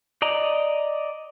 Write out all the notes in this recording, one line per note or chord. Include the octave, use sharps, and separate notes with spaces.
D5 D#5 A#5